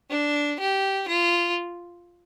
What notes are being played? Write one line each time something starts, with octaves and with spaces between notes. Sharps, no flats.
D4
G4
F4